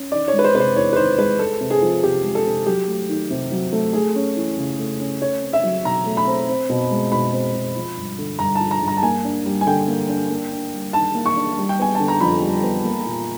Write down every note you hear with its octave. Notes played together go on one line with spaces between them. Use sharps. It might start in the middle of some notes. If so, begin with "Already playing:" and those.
Already playing: C#4
D#3 D5
C#5
G#3
B4
C5
C3 B4
C5
E2 C#5
B4
D#3 C5
G#3 B4
G#3 A4
C3
G#4
F3
C3 G4
G#3
A4
C3
F#3 G4
A3
D#3
C3
F#3
A3
A3 G#4
C#4
E3
C#3
A3
C#4
A3 C#5
C4
E5
F#3
B2 A#5
A3
B5
C4
C4
B2
G#3
B2 B5
C4
B2
F3
G2
D3
G2 A#5
F3 A5
A#5
G2
A#5
A5
A#3 G#5
D4
G3
G#5
D3 G5
A#3
D4
A#3
D4
G3
D#3 A5
A#3
C#6
D4
G3
G5
B3 G#5
D3 A5
A#5
F2 B5
G3
B3
A#3
A#2